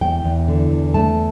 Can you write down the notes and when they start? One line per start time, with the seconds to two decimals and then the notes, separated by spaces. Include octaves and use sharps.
0.01 E2 G5
0.24 E2
0.48 D3
0.71 E2
0.94 A3 A5